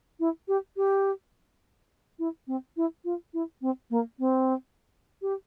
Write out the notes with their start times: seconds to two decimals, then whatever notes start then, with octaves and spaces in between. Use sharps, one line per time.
0.20 E4
0.48 G4
0.77 G4
2.19 E4
2.47 C4
2.77 E4
3.05 F4
3.34 E4
3.62 C4
3.90 A#3
4.19 C4
5.22 G4